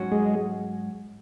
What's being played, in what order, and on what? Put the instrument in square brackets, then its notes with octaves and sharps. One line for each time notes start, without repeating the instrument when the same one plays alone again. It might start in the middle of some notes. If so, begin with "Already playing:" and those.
Already playing: [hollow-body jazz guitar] G#2 F#3 C#4 F#4
[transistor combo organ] G#3